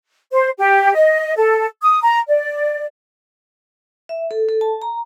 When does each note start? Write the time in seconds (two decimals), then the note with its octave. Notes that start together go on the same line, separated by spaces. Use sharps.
0.32 C5
0.58 G4
0.95 D#5
1.36 A4
1.82 D#6
2.03 A#5
2.28 D5
4.09 E5
4.31 A4
4.49 A4
4.61 A5
4.82 A#5